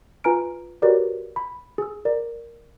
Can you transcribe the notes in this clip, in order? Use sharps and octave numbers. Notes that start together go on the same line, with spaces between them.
F4 B4 G#5 A#5 F6 D7
F#4 G4 A#4 B4 C#5 D5
B5
G#4 E6
A#4 D5